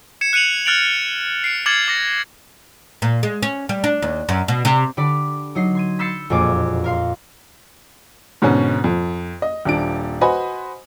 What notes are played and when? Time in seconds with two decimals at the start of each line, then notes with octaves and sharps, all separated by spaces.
0.21 G#6 C#7 E7
0.33 F#6 C#7 D#7 F7 F#7
0.66 F6 F#6 A6 D7 F7 F#7
1.44 C7 D7
1.66 D6 F6 G#6 A6 C#7 F#7
1.88 D6 A#6 C#7
3.02 A#2
3.23 G#3
3.42 C#4
3.69 G3
3.84 D4
4.02 D#2
4.29 F#2
4.48 B2
4.65 C3
4.97 D3 G4 D5 B5
5.55 F#3 D#4 C7
5.75 C6 G#6 D#7
5.99 B5 E6 G6 A6 C7 C#7
6.30 E1 F2 A#2 A#3 G#5 D6
6.84 A#4 F5 C6
8.42 G#2 B2 D3 C#4
8.84 F2
9.42 D#5
9.65 D#1 D4 D7
10.21 F#4 B4 C5 D#5 G#5 B5